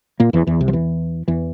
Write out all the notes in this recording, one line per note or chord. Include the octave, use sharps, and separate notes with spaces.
A#2 A#3
E2 E3
E2 E3
C2 C3
F3
E2 E3
E2 E3